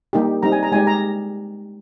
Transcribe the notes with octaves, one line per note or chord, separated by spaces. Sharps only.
G3 A#3 D#4 G4
G3 C4 D#4 A#5
G#5
A#5
G#3 D#4 G4 G#5
A#5